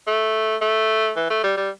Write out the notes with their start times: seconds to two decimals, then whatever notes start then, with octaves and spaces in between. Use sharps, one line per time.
0.07 A3
0.61 A3
1.16 E3
1.30 A3
1.44 G3
1.57 G3